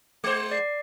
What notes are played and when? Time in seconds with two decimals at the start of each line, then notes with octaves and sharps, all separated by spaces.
0.24 G#3 C5
0.51 D5 C7